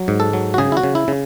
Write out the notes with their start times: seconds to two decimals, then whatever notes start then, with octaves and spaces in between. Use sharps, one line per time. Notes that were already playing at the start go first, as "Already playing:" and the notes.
Already playing: F#3
0.08 G#2
0.20 A4
0.33 F#3
0.54 F#4
0.58 C#3 G#4
0.72 E4
0.77 F#4
0.83 C#3
0.95 E4
1.08 C#3